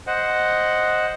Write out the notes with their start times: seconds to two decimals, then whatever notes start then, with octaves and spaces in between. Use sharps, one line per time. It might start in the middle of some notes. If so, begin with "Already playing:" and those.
0.07 C5 D#5 F#5